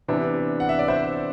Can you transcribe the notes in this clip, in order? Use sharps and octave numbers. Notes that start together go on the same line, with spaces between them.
C3 E3 B3 D4
F#5
E5
D5
C5 E5